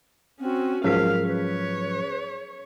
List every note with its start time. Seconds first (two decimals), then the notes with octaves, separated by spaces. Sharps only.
0.40 C4 C#4 F#4
0.84 G#2 F3 F#3 C#4 G#4 A#4 F5 B6
1.28 B4 C#5